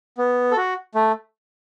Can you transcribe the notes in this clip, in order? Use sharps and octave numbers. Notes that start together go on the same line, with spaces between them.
B3
A4
F#4
A3